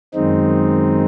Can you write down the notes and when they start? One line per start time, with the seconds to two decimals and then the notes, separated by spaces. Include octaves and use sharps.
0.14 F#2 D#3 G#3 C4 D#4